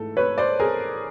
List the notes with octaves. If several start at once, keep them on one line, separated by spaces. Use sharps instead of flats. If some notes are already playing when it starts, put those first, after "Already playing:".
Already playing: G#2 E3 A3 A4
B4 C#5
C5 D5
G#4 A#4